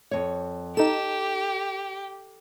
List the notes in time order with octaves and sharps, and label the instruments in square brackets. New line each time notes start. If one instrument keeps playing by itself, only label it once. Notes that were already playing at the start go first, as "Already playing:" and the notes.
[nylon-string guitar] F2 C#5
[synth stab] D#4 E7 [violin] G4 [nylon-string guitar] A4